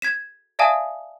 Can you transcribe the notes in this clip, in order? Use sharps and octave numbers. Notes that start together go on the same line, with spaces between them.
G#6 B6 E7
D5 E5 F5 G#5 A5 D#6